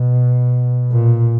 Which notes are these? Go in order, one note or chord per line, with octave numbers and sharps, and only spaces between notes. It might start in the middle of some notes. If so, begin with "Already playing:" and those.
Already playing: B2
A#2